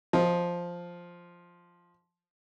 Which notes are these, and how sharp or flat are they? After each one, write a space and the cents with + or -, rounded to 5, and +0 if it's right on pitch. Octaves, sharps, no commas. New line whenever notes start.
F3 +0 D#5 +10